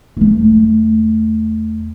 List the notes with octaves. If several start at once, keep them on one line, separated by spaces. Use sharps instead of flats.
E2 A3